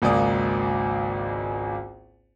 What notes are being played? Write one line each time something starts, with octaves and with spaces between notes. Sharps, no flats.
G#1 C#2 A#3 D5 D#6